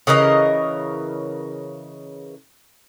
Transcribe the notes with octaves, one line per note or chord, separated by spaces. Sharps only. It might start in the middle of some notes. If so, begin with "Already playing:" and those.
C#3 E3 A#4 D#5